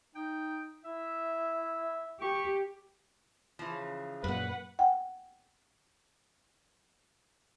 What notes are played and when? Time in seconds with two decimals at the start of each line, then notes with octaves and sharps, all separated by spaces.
0.15 D#4 G5
0.84 E4 E5
2.21 G4 C#6
3.59 C#3 E3 F3
4.24 F#2 A#2 B4 F#5
4.79 F#5 G5